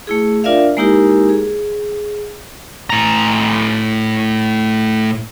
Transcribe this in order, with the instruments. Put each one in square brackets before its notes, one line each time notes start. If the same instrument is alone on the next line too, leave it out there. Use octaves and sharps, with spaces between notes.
[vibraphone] A3 E4 G#4
D4 F4 A#4 D5 E5 F5
G#3 A#3 D#4 E4 G4 A#4
G#4
[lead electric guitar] A2 A#5